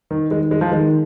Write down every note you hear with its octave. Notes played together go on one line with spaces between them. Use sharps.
D#3
D#3 G#3
G#3
F3
D#3 G#3